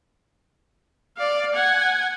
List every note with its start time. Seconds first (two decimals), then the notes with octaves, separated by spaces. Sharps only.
1.18 D5 F5
1.55 F#5 G#5